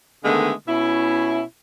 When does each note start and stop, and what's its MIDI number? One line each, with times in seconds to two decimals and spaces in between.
0.25 0.52 50
0.25 0.52 51
0.25 0.52 56
0.25 0.52 57
0.25 0.52 59
0.68 1.42 47
0.68 1.42 61
0.68 1.42 64